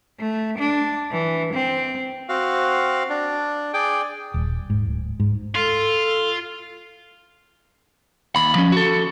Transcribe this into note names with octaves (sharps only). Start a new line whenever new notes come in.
A3
D4
E3
C4
C4 F#4 F5
D4
G#4 D5 G5 D6
D#1
G#2
D1
G#2
F4 A4
D#2 B5
F3 C#4
F#4 A4